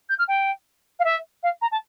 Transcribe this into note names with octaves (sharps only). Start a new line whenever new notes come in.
G6
F6
G5
F5
E5
F5
A#5
A5